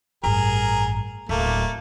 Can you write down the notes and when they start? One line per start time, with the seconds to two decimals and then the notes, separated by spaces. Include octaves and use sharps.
0.24 A1 G2 G#4 A#4
1.29 D1 A3 A#3